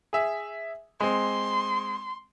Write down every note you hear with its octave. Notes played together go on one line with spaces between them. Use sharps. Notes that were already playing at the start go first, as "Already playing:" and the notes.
G#4 E5
G#3 C4 C6